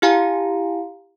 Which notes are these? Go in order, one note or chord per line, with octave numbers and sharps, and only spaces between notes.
E4 G4 F5 G#5 A#5